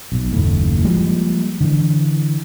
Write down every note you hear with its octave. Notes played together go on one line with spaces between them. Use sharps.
B1
F#1 D#2 A2
F3 G3 G#3 A#3
D3 E3